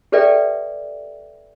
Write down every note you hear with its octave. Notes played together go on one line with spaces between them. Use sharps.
G4 A4 B4 D5 E5 G5